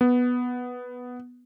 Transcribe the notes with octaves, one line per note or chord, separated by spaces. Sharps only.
B3